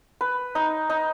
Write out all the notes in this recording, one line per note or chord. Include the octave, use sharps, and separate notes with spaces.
B4
D#4
D#4